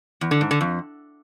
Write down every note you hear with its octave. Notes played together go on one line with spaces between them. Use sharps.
E2
D3
G#2
D3
F2